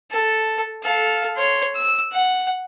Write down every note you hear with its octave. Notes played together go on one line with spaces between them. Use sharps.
A4
A4 F5
C#5 C6
E6
F#5